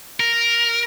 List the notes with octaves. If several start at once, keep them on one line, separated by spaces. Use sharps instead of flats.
A#4